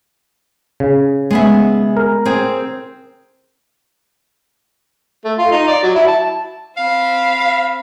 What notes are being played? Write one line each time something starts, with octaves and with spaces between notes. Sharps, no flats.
C#3
G#3 B3 E5
A#4
C4 G#4
A3
F4
D#4
D5
F#3
E4
A5
C4 F5 B5